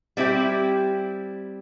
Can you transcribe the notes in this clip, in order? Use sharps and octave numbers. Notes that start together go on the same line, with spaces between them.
G3 C4 E4 G4